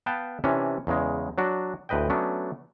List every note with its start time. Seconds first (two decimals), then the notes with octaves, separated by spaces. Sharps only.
0.06 B3 B4 F5 G5 A5
0.44 C3 E3 C#4 D4
0.87 E2 C#3 G#3
1.38 F#3 D4 F#4
1.89 D2 A2 B4 D#5 G5
2.10 F#3 A3 B3 C#4 D4